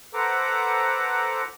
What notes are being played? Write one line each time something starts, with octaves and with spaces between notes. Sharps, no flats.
A4 B4 C5 F#5 A#5 D6